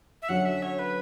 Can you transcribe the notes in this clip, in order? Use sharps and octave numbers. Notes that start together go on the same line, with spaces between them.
E5
D3 F#3 C#4 F#4 F#5
E5
C#5
B4